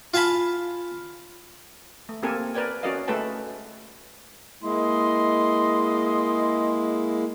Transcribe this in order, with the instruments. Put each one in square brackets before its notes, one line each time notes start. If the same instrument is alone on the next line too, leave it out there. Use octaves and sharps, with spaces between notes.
[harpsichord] F4 F5 G#5 A5 B5
[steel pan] A3
A#3 C4 G4 A4 A#4 G#5
A#4 B4 D5 G5 G#5
C#4 F#4 A#4 D5 D#5 F5
G#3 A3 A4 B4 G5 A5
[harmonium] G#3 A#3 E4 [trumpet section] D#5 C6